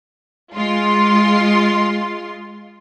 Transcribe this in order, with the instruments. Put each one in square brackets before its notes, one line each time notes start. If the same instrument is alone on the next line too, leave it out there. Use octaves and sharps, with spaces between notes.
[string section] G#3 F4 C6